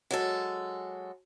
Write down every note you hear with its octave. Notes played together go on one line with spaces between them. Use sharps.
F#3 G#3 A4